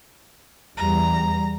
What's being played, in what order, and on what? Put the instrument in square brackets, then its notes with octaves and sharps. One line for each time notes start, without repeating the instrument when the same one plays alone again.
[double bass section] E2 G3 [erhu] A#5